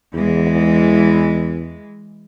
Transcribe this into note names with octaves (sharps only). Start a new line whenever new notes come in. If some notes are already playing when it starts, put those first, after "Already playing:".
E2 E3 G#3